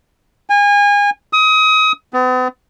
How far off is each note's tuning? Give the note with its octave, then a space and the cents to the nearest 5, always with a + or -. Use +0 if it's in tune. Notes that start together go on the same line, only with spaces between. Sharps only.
G#5 -30
D#6 +30
B3 +45